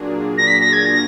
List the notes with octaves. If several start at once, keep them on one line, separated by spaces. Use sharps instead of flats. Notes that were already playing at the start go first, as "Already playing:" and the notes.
Already playing: A#2 F#3 A#3 D4 G#4
A#6
B6
A#6
G#6
A#6